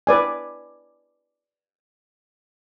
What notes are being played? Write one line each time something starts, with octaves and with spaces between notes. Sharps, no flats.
B4 D5 G#5